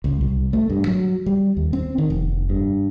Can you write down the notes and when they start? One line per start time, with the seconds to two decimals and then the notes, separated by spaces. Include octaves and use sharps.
0.04 C#2
0.21 C2
0.53 A3
0.70 G2
0.87 F#3
1.26 G3
1.57 D#2
1.73 C4
1.98 D#3
2.10 F1
2.49 G2